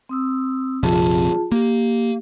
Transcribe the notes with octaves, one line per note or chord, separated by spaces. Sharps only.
C4 D#6 E6
A#1 F2 C3 F4 G#4 A5
A#3 G4